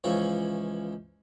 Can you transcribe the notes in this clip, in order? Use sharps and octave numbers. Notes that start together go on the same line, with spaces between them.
C#2 E3 F3 C#5